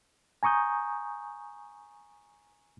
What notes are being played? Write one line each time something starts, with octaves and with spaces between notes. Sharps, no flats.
G#5 A#5 C#6 D#6 G6